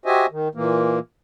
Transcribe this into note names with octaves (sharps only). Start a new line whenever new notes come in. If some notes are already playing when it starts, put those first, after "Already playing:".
F#4 G4 C5 D#5 E5 G#5
D#3
A#2 E3 A#3